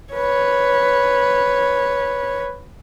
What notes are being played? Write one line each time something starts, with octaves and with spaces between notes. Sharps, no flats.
B4 C#5